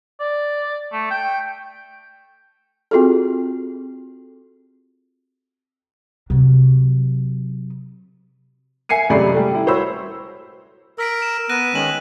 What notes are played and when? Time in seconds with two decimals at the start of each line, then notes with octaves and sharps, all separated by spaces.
0.20 D5
0.92 A3
1.11 G5
2.91 C4 F4 F#4 G#4 A4
6.30 C3 F#3
8.89 E5 G#5 C7 C#7 D#7
9.10 F#2 C3 G#3 A3 D5 B5
9.32 G3 A3
9.52 G3 E4
9.67 F#4 C5 C#5 B5 E6
10.98 A#4 E6 B6 D7
11.22 E7
11.49 B3 F#6 A#6 D#7
11.74 D#3 G#3 C#4 E7 F#7